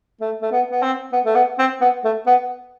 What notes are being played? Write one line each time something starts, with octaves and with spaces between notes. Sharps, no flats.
A3
A3
B3
B3
C4
B3
A3
B3
C4
B3
A3
B3